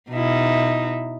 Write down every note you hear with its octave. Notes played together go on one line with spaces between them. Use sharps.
B2 D#4 E4